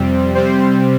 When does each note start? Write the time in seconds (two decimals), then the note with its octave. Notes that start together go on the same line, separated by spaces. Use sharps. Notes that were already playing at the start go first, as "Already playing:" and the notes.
Already playing: F2 C3 G3 C4
0.35 C3 G3 C4 C5